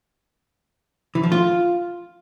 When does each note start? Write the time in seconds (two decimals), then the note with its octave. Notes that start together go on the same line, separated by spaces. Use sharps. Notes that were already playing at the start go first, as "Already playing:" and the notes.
1.15 E3
1.23 F3
1.32 F4